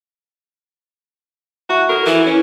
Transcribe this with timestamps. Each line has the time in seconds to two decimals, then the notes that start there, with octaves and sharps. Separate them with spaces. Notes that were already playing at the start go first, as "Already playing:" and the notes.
1.69 E4 F#4 E5 C#6
1.89 F#4 A4 A#4 D5
2.06 E3 E4
2.27 C#4